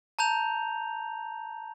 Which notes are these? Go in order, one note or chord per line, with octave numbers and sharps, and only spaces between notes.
A5 A#5 G6 F7